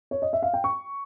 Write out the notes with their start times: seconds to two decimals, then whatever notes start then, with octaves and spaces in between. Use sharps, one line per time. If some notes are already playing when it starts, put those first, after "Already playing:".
0.11 C#5
0.22 D#5
0.33 E5
0.42 F5
0.54 G5
0.64 C#6